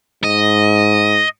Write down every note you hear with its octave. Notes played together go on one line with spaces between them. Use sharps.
G#2 D#5